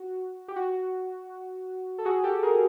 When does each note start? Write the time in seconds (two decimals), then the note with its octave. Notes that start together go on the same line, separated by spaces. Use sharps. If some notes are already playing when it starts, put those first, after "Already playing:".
Already playing: F#4
0.48 G4
0.56 F#4
1.98 A4
2.05 F#4 G#4
2.23 G4 A4
2.43 G#4 A#4